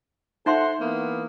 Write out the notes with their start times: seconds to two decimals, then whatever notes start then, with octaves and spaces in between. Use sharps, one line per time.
0.46 D#4 A4 C5 E5 F#5 C6
0.79 E3 A#3 B3